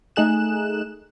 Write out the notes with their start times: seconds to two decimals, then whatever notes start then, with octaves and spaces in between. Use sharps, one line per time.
0.16 A3 D#4 G#4 F#6 E7